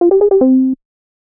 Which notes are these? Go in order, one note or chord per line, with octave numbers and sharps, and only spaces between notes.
F4
G4
G#4
G4
C4